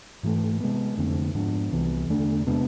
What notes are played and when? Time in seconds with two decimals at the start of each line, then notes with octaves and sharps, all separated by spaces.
0.23 G#2 E3 A3
0.60 C3 G#3 B3
0.97 F2 D3 A3 C4
1.35 G#2 F3 B3 D4
1.72 C2 C3 E3 B3
2.09 E2 D3 A3 D4
2.46 C3 G#3 B3 D4